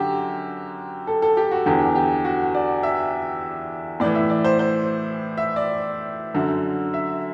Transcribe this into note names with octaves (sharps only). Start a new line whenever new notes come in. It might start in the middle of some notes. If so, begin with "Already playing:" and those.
Already playing: F#2 D3 F#4 G4
A4
A4
G4
F#4
E2 D3 G4
G4
F#4
D5
E5
A2 E3 D5
E5
D5
C5
C5
E5
D5
F#2 D3
E5